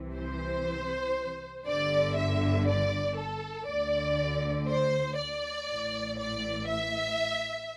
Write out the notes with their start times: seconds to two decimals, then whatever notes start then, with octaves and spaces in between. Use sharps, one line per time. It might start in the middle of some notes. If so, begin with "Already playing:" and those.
Already playing: C2 C3 E3
0.15 C5
1.66 G1 G2 D3 D5
2.17 E5
2.66 D5
3.17 A4
3.67 D2 D3 D5
4.68 C5
5.18 D5
5.68 A1 A2 E3
6.19 D5
6.68 E5